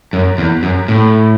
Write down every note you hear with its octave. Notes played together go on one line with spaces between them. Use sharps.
F#2
E2
F#2
A2